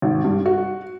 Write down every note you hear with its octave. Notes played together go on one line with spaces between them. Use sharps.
G#1
G2
F#4